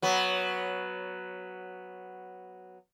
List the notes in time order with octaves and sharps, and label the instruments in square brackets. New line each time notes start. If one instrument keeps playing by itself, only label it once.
[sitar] F#3 B3